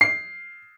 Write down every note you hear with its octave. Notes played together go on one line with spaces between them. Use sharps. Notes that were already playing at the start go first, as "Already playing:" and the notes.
C7